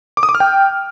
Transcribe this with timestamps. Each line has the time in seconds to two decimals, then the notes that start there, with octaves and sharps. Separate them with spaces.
0.17 D6
0.23 D#6
0.29 D6
0.35 F6
0.40 G5